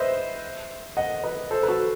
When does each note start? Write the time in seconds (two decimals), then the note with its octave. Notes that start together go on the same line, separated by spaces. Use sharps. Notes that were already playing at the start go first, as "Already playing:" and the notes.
Already playing: B4 C5 D#5 E5
0.97 D#5 F#5
1.24 B4 D#5
1.51 A4 C5
1.63 B4
1.68 F#4 A4